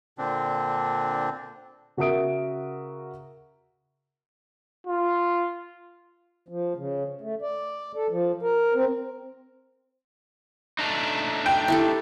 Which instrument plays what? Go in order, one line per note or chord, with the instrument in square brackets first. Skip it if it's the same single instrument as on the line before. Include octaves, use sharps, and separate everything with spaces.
[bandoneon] A#2 D3 C4 D4
[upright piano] C#3 F#4 A#4 E5 D#6 D7
[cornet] F4
[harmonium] F3
C#3
A3
D5
A4
F3
A#4
C4
[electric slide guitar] A3 D4 D#4
[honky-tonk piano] G5
[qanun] E4 G4 A4